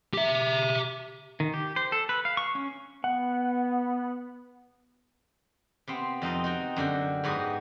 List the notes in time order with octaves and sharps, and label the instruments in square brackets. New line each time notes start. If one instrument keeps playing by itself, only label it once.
[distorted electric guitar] G4 E5
[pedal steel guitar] D#3
G4
C5
A4
B4
F5
C#6
C#4
[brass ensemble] B3 [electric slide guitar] F#5
[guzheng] C3 B3 C4
F2 D#4 F4 D#5
D#4 F#4 G5
F#2 D3 F#4 G5
G#2 B3 F#4 G4 D#5